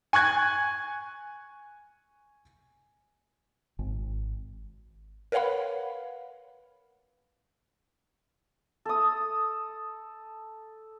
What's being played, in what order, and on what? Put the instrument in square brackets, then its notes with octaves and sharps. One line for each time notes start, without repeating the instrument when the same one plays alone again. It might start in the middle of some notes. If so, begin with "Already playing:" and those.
[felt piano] G#5 C#6 F#6 G#6
[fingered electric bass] G#1
[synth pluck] A#4 B4 C#5 F5 F#5 B5
[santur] A4 D#6